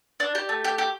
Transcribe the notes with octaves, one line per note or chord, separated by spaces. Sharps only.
D4
G4
A3
G4
G4